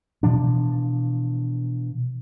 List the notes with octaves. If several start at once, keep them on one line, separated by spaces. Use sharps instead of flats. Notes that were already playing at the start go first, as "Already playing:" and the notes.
B2 E3 F3 D4